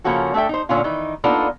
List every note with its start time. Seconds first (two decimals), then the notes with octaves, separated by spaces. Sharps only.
0.04 C#3 F3 A#3 C#4 F#4 A4
0.34 A3 D4 A4 E5 G5
0.49 D#4 C5
0.69 A#2 D3 C#4 F4
0.84 D#3 E3 D#4
1.24 A#3 B3 D4 D#4 F4 A4